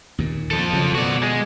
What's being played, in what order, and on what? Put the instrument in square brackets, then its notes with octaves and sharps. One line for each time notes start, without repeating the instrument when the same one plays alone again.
[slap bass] D#2 A#2
[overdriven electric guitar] F3 A4
[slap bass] C#3 E3 F#3
[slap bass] B2 [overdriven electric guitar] F#4 D5
[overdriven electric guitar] G#3